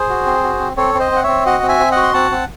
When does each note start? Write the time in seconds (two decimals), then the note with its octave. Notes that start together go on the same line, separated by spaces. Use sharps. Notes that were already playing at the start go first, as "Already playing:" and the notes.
Already playing: G#4 C5
0.09 F#4
0.26 C4
0.43 F#4
0.60 C4
0.77 C4 A4 C#5
0.94 C4
0.99 C5 D#5
1.12 C4 F#5
1.23 C4 C#5 E5
1.46 F#4 D#5 F#5
1.63 C4
1.68 E5 G#5
1.79 C4
1.91 D#5 F#5
1.97 F#4
2.03 C6
2.14 C4 F#5 A5
2.31 C4